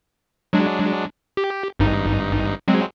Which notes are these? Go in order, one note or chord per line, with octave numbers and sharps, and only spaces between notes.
F#3 G#3 D4
G4
G#1 G2 D#4
F#3 G#3 C4